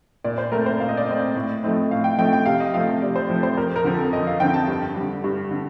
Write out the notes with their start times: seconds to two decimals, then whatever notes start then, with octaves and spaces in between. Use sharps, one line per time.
0.24 A#2 D5
0.38 C5
0.52 A3 C4 A#4
0.66 C5
0.80 A#2 F5
0.89 D#5
0.97 D5
1.06 A3 C4 D#5
1.35 A2
1.63 F3 A3 C4 D#4
1.91 A2 F5
2.04 G5
2.18 F3 A3 C4 D#4 G5
2.33 G5
2.46 C3 F5
2.60 D#5
2.74 F3 A3 C4 F5
3.02 C3 D5
3.16 C5
3.29 F3 A3 C4
3.43 C5
3.57 F2 A#4
3.76 A#4
3.84 D3 F3 C4
3.94 A4
4.13 F2 D#5
4.27 F5
4.40 D3 F3 C4 G5
4.54 A5
4.68 G2
4.95 D3 G3
5.24 G2
5.51 D3